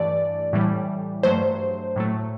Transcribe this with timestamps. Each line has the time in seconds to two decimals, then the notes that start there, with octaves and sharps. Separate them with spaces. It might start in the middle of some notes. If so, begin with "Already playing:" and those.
Already playing: G2 E3 A3 D5
0.53 A2 E3 G3
1.23 G2 F#3 A3 C5
1.96 A2 F#3 A3